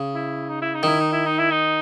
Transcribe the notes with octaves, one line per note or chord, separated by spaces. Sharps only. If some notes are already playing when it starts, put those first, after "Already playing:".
Already playing: C#3
E4
D#4
E4
D#4
D#3 E4
D#4
E4
D#4
E4
D#4